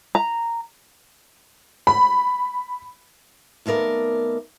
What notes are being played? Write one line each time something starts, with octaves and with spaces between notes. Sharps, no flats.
A#5
B5
D#2 A3 B3 A#4 D5